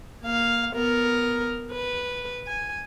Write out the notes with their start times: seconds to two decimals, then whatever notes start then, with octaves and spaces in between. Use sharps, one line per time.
0.22 A#3 F5
0.74 B3 A#4
1.72 B4
2.47 G#5